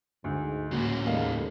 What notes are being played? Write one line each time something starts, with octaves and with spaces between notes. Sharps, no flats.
D2 G#2
A2 C#3 F#3 A#3 F#4
D#2 G3 G#3 A#3 D#4 A4 F5